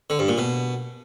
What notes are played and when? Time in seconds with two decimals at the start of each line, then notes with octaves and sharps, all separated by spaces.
0.10 D3
0.19 G2
0.28 A#2
0.38 B2